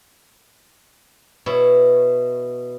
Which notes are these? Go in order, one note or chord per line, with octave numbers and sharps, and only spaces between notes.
B2 E4 C#5